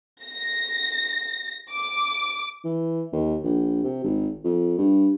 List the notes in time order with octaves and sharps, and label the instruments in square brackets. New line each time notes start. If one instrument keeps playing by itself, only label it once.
[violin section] A#6
D6
[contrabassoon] E3
D#2
A#1
C3
G#1
F2
G2